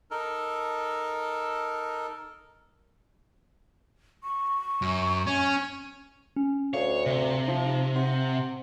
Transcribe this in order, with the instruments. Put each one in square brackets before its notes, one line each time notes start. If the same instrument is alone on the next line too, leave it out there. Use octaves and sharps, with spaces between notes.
[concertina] D#4 A4 A#4
[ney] C#6
[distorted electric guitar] F#2
C#4
[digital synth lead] C#4
[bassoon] D2 [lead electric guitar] C#5 [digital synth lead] F5
[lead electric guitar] C3
[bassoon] F3 [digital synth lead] D#4
[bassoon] C5 [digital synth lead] F#5